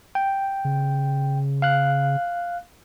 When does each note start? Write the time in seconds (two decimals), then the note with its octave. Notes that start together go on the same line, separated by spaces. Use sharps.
0.15 G5
0.65 C#3
1.62 F5 F#6